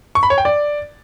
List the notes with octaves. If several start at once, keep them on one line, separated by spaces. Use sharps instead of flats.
C#6
B5
C#5
G5
D5